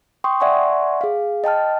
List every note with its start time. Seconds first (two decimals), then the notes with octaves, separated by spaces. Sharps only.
0.24 G5 C6 C#6 D#6
0.40 D5 E5 F#5 G#5 C6 C#6
1.01 G#4 F5
1.44 D#5 G5 A5 F6